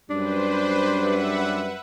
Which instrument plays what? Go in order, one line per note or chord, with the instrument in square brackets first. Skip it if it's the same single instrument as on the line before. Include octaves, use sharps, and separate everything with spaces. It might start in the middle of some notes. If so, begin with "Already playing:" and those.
[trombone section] F#2 G3 [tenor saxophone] D4 [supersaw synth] B4 C5
[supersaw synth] B4 E5 F#5